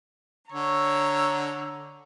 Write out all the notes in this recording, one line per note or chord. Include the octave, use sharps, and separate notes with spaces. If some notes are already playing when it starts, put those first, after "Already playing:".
D3 C#5 A#5 E6